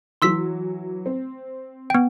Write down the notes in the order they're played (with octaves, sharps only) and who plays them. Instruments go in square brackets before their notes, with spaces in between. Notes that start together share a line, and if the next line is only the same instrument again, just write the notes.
[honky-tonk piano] E3 F#3 [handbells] C6 E6 B6
[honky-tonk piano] C4
[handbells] B3 G5